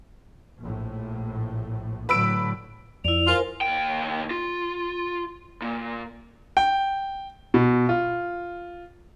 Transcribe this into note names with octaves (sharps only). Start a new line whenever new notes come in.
A#1 A2
A2 D3 F#3 B4 E6 D7
F2 E4 D5 F7
F4 A#4 C5 G#5
D#2 G5
F4
A#2
G5
B2
F4